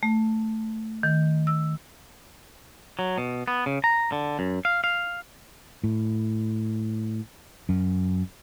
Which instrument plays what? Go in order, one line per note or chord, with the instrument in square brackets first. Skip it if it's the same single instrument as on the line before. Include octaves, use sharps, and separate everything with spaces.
[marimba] A3
D#3
E6
[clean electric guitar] F#3
B2
B3
C#3
A#5
D3
F#2
F5
F5
[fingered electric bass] A2
F#2